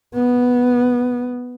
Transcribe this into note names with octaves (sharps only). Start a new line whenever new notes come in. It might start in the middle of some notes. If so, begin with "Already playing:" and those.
B3